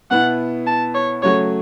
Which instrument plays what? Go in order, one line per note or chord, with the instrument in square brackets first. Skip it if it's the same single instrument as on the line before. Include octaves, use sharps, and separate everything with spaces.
[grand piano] B2 B3 E4 [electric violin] F#5
[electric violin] A5
C#5
[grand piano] C#3 F#3 A3 F#4 [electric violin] C#5